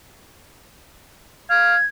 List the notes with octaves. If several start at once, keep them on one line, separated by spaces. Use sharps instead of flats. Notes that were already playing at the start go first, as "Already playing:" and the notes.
F5 G#6